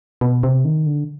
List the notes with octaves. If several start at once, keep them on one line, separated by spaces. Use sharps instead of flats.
B2
C3
D#3
D3